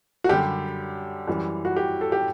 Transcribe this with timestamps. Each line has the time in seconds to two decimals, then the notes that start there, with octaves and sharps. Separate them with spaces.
0.24 F#4
0.29 F#2 D3 G3 G4
1.28 F#2 E3 G3
1.65 F#4
1.76 G4
2.01 A4
2.12 G4